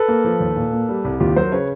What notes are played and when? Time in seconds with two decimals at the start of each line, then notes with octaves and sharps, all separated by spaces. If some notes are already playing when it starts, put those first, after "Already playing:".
Already playing: A4 B4
0.08 A#3
0.24 F3
0.40 D#2
0.56 A#2
0.72 A#3
0.89 G3
1.05 C2
1.20 D#2 F4 G4
1.36 F#3 A#4 C5
1.52 C#3 B4 C#5